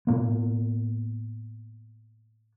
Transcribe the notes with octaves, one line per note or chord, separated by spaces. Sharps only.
A2 A#3 B3